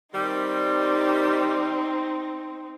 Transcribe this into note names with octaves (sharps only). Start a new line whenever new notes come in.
D#3 G3 C4 D#4